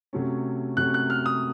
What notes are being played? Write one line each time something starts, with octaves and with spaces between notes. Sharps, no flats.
C3 F#3 A3 C#4
C3 F#3 A3 C#4 F#6
F#6
F6
D#6